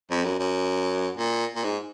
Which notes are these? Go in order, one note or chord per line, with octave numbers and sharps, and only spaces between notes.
F2
F#2
F#2
A#2
A#2
G#2